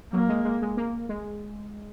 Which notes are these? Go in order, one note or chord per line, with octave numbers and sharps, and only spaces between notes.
F#3 A#3
G#3
G#3
G#3
A#3
G#3